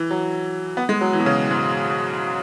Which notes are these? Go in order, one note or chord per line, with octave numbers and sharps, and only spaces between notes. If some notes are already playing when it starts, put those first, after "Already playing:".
Already playing: E3
F#3
B3
G#3
F#3
E3
B2
C#3
G#2